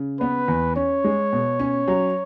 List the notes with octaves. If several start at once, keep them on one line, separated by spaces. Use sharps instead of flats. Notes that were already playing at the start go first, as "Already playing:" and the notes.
Already playing: C#3
B3 B4
E2
C#4 C#5
G#3
B2
C#4
F#3